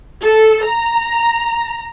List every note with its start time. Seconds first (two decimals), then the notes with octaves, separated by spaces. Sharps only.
0.22 A4
0.64 A#5